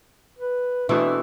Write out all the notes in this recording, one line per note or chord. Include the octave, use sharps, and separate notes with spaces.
B4
B2 E3 A3 C4 D4